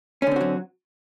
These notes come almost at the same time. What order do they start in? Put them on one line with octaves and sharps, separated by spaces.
C#4 D3 C4 F#4 F#3